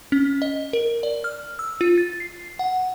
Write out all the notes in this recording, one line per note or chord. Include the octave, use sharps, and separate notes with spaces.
C#4
D#5
A#4
D5
F6
E6
F4
A6
C7
F#5